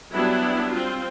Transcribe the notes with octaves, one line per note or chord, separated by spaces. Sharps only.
F#3 G3 B3 D4 E4
C4 F4